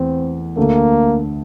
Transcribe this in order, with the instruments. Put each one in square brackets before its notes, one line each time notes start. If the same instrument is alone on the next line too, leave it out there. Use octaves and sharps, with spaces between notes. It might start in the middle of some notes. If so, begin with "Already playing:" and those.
Already playing: [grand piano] E2 A3 [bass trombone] C4
[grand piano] D2 D3 A3 [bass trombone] A#3